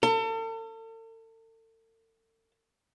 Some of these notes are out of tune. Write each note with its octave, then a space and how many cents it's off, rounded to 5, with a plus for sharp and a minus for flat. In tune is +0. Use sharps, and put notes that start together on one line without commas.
A4 +40